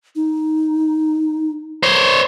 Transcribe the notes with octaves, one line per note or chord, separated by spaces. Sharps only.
D#4
C5 C#5